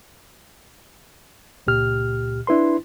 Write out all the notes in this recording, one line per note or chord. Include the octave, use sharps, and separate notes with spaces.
C#2 A#2 G4 F6
D4 E4 B4 C6